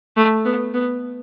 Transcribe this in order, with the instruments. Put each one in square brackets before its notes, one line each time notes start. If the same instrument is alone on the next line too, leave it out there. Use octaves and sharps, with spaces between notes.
[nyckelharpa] A3
B3
B3